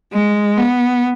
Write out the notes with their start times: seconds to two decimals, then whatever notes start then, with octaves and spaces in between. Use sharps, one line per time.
0.13 G#3
0.57 B3